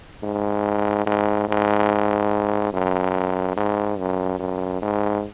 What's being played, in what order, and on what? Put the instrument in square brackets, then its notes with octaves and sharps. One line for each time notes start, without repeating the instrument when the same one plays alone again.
[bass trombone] G#2
G#2
G#2
F#2
G#2
F#2
F#2
G#2